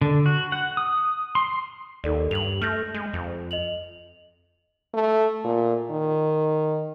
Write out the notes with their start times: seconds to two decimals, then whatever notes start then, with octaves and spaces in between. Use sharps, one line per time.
0.01 D3
0.26 F#4
0.52 F#5
0.77 D#6
1.35 C6
2.04 D#2 D#4 A4 D5
2.31 G2 F7 F#7
2.62 A3 F6 G6 A#6
2.94 G#3
3.13 F2
3.51 D#5 F7 F#7
4.94 A3
5.44 A#2
5.90 D#3